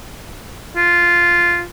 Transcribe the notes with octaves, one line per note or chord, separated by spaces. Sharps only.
F4